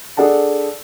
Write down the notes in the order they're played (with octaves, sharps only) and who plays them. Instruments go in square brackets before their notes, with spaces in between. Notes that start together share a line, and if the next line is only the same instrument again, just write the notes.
[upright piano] D4 G#4 A4 D5 F#5 A5